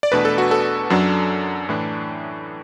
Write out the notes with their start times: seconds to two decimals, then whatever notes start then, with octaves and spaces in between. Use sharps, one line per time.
0.03 D5
0.12 E2 B2 A3 D4 B4
0.25 A4
0.38 F#4
0.51 A4
0.90 F#2 F#3 D4
1.69 A2 E3 D4